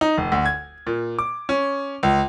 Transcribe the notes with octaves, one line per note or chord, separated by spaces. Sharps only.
D#4
F1
D2
G#6
A#2
D6
C#4
C#2